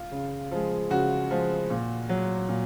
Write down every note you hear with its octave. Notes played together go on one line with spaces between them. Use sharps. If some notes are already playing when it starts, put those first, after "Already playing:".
Already playing: F4
C#3
F3 G#3
C#3 F#4
F3 G#3
A#2
F#3
A#2